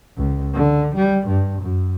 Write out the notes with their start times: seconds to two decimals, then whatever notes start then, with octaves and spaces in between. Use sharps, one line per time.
0.17 C#2
0.54 D3
0.96 G3
1.27 G2
1.62 F#2